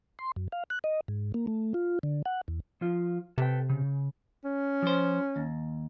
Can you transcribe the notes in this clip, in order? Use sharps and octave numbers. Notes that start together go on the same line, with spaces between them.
C6
F#2
F5
F#6
D#5
G#2
A#3
A3
F4
D3
F#5
E2
F3 F4
C3 A4 B4 G5
C#3
C#4
F3 C5
D#2